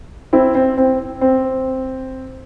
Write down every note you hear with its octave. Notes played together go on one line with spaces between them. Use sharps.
C4 E4
C4
C4
C4